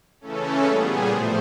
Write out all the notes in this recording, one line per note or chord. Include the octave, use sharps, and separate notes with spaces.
C#3 E3 A3 C#4 A4
A#2 G3 B3 G#4
A2 F3 A3 C5